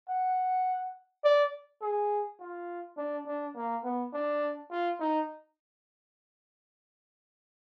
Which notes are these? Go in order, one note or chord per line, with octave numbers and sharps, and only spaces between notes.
F#5
D5
G#4
F4
D4
D4
A#3
B3
D4
F4
D#4